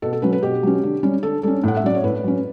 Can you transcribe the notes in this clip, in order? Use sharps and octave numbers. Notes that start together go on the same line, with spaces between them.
B2 A4
A4
F#3 C#4 B4
B4
B2 G4
F#3 C#4
D3
G3 C#4
D3 A4
G3 C#4 A4
A2 F#5
E5
F#3 C#4 D5
C#5
A2 B4
F#3 C#4